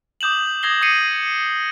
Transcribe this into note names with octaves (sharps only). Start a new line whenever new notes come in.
D6 D#6 G6 E7 F#7
D#6 G#6 A#6 C7 G7
D6 D#6 A#6 C7 C#7 D#7